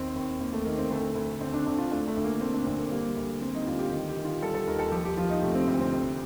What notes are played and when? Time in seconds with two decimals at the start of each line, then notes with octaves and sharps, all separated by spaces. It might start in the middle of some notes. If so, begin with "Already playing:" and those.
Already playing: D#2 C4
0.16 D#2
0.40 D#2 A#3
0.53 A3
0.65 D#3 A#3
0.78 C4
0.90 D2 A3
1.15 D2
1.41 D2 C4
1.53 D4
1.66 D2 D4
1.78 F4
1.91 A3 D4
2.08 A3
2.17 D2
2.24 A#3
2.41 A3 C4
2.54 D4
2.66 D2 C4
2.79 A#3
2.91 G3 A#3
3.17 D2
3.41 G3 C4
3.55 D#4
3.67 D2 F4
3.79 G4
3.92 D#3
4.09 G4
4.17 D#3
4.25 F4
4.42 G3 A4
4.54 A4
4.67 D#2 A#4
4.79 A4
4.92 F3 G4
5.05 G4
5.17 F3 F4
5.30 D#4
5.42 C3 A3
5.55 C4
5.68 D2 C4
5.81 C4
5.92 C3